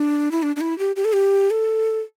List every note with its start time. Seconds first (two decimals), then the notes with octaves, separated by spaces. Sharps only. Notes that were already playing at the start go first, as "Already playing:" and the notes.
Already playing: D4
0.31 E4
0.43 D4
0.56 D4
0.61 E4
0.79 G4
0.96 G4
1.05 A4
1.13 G4
1.50 A4